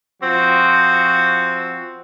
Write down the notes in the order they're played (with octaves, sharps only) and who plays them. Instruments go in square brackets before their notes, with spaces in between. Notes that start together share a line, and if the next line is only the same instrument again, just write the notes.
[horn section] F3 C4 F#4